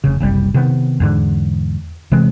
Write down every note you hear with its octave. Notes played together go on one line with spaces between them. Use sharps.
F1 C#3
F#1 C2 G3
C3 D#3 B3
E2 G#2 D3
C3 E3 G#3 C4